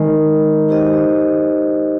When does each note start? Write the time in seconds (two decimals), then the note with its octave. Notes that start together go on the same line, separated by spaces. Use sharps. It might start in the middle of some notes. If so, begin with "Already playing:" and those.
Already playing: D#3 G#3 D#4 A#4 D#5
0.69 D#4 G4 C5 D#5